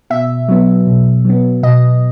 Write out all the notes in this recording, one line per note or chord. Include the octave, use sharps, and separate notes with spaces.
B2 E5
F#3 B3
B2
F#3 B3
B2 D#5